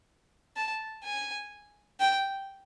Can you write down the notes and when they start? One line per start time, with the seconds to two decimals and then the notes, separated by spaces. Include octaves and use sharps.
0.56 A5
1.04 G#5
2.00 G5